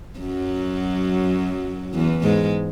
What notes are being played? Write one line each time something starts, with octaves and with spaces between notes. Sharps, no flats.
F#2 F#3
E2 E3
G#2 G#3